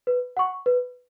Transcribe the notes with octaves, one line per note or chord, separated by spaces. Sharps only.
B4
F#5 C#6
B4